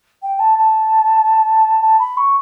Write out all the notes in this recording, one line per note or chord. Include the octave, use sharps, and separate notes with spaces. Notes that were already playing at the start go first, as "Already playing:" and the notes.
G5
A5
A5
A5
B5
C#6